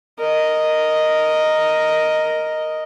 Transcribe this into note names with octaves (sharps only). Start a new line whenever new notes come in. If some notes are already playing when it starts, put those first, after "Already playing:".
A#4 D#5